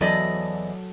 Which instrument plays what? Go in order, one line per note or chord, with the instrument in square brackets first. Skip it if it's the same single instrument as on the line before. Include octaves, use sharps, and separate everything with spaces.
[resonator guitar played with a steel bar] E2 D5 D#5 [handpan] F#3 A4